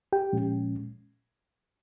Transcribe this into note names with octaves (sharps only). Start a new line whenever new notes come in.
G4 G5
A#2 F3 G#3 C#4